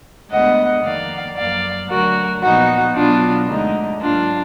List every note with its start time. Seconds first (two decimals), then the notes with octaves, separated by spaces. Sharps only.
0.30 D2 D3 G#3 B3 D#5 F#5
0.83 F2 D#3 A#3 D5 F5
1.36 F#2 F3 A#3 D5 F5
1.89 D2 D3 F#3 F#4 A#4
2.42 A#2 F3 B3 D#4 F#4
2.95 B2 F#3 B3 D4 F4
3.48 D2 D3 G#3 D#4
4.01 G#2 F#3 A#3 D4 F4